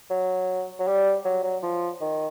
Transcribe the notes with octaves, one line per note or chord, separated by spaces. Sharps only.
F#3
F#3
G3
F#3
F#3
F3
D#3